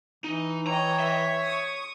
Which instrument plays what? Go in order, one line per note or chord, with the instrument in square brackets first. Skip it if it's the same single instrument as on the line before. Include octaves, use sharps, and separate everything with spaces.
[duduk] E3 [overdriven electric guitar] D#4
[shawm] C#5 [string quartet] D#5 G5 [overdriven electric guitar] A#5
[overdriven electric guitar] E5
[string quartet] C#6 D#6